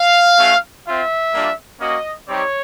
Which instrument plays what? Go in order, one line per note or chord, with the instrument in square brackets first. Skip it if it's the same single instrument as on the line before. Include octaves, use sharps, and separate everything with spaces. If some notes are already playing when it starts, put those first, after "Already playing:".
Already playing: [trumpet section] F5
A3 C#4 F#4
C4 F4 E5
G3 A#3 D4 F4
A#3 C#4 F#4 D#5
G3 C4 D#4 G4 C#5